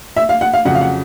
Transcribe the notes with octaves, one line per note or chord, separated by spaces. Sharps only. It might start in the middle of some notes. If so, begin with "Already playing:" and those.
E5
F5
F#5
F5
F2 C#3 F#3 F#5
F5
F#5